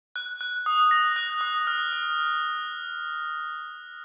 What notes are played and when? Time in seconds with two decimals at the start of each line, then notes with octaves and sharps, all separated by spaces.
0.16 F#6
0.41 F#6
0.66 D#6
0.91 A#6
1.16 F#6
1.41 D#6
1.67 F6
1.93 F6